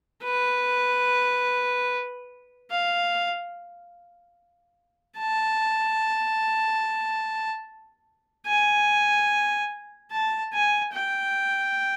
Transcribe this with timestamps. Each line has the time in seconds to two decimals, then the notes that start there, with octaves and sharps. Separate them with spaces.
0.24 B4
2.71 F5
5.18 A5
8.47 G#5
10.12 A5
10.53 G#5
10.93 G5